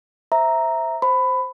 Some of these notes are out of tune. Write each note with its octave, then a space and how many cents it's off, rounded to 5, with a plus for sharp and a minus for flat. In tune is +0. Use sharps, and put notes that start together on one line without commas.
C5 +0 E5 -5 A#5 +0
C5 +0 B5 +15